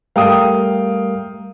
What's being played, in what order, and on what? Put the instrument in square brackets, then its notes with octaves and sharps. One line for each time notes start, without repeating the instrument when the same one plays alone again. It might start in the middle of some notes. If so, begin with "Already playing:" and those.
[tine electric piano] G3 A3 A#4 [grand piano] F5 G5 D#6